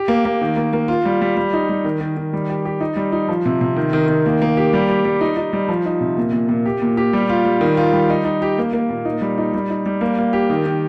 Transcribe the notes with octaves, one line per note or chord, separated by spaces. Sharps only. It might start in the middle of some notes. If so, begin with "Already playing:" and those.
Already playing: G4
A#3
A#3
D#3
A#3
A#3
F4
G3
G3
G3
D#4
G3
D#3
D#3
D#3
G3
G4
G4
D#4
G3
D#4
F3
C3
C3
D#3
D#3
D#3
A#3
A#3
G4
G3
G4
G3
D#4
D#4
G3
F3
D#4
C3
A#2
A#2
A#2
G4
A#2
G4
G3
F4
G3
D#3
F4
G3
D#4
D#4
G4
A#3
A#3
A#2
D#4
G3
D#4
G3
D#4
G3
A#3
A#3
G4
D#3
D#3